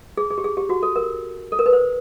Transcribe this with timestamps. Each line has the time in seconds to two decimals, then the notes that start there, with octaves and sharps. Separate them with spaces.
0.17 G#4
0.31 G#4
0.38 G4
0.44 G#4
0.57 G4
0.69 F#4
0.83 A4
0.96 A#4
1.52 A4
1.59 A#4
1.66 B4
1.73 C5